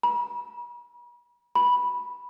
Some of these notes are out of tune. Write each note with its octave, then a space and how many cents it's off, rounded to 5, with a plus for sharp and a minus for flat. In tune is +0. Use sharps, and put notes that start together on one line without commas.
B5 -45
B5 -10